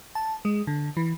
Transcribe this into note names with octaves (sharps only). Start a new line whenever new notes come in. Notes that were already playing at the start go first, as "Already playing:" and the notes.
A5
G#3
D3
E3